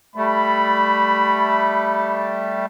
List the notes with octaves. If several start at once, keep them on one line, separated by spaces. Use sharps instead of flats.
G3 A3 B5